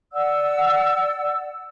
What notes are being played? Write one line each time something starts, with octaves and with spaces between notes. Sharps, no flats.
D5 F#5 E6